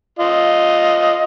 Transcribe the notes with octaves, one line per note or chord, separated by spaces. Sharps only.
F4 D#5